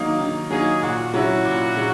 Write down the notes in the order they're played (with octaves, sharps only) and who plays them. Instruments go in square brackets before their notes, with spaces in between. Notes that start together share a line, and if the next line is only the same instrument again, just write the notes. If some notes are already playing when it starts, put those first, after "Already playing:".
Already playing: [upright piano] D#3 F#3 A#3 D#4
D#3
[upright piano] F#3 A#3 D#4 [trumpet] G#4
[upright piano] A#2 [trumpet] F#4
[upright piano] F#3 C#4 E4 [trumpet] F#4
[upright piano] A#2
F#3